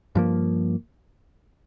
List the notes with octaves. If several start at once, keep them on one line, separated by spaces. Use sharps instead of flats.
G2 F3 A#3